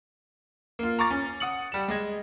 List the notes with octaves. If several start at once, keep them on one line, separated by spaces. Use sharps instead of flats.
A#3 F4
A#5 C#6 D6 A6
C#4
F#5 D#6 C#7 F#7
G3 E7
G#3 D#5 G#6